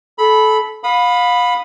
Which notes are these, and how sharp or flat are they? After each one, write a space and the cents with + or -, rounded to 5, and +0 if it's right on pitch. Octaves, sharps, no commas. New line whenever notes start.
A4 -25 B5 +0
F5 +35 B5 +0 D#6 -10